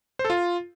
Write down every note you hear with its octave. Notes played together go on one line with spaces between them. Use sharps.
C5
A4
F4